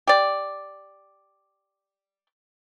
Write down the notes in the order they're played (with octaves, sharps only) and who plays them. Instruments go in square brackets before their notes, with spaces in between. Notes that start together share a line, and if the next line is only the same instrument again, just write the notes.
[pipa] G4 D5